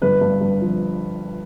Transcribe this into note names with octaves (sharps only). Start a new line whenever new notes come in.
G1 B4
G2
G2
F3